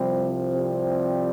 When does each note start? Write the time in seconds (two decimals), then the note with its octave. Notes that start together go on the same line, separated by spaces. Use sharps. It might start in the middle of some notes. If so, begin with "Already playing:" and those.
Already playing: C2 C3 F3 G3 C4
0.53 G3 C4